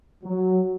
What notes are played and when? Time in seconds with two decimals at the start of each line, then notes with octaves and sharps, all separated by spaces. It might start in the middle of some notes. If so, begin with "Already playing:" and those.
0.23 F#3